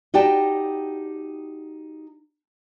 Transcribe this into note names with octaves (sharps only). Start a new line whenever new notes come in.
D#4 F#4 G4 D5 G5 A5